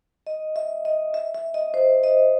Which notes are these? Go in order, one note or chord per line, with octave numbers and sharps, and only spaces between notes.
D#5
E5
D#5
E5
E5
D#5
C5
D#5